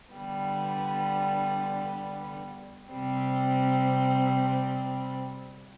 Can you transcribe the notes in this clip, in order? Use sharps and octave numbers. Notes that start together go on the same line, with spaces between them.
D3 G3 B3
C3 G3 C4